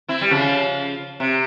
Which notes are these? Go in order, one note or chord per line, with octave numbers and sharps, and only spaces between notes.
C4 E4
G3
C#3 F3
C3